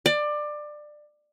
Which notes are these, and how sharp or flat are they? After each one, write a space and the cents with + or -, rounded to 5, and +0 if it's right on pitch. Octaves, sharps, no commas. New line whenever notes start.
D5 +20